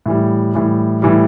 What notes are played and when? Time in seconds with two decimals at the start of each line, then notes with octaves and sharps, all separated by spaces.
0.06 A2 E3 G3
0.54 A2 E3 G3
1.02 A2 E3 G3